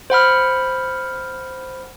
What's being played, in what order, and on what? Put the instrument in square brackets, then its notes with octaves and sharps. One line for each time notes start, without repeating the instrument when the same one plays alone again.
[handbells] C5 F#5 B5 F6